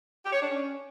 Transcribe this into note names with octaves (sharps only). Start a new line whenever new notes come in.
G4
C#5
D4
C#4